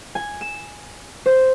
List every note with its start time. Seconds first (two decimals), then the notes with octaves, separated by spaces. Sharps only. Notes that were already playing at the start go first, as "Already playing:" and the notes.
0.15 G#5
0.41 E7
1.26 C5